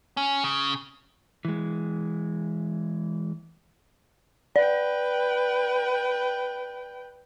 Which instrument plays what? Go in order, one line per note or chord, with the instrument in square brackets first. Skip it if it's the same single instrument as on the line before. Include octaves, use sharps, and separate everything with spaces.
[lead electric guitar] C#4
C#3
E3 G#3
[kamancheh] B4 G5 [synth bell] D5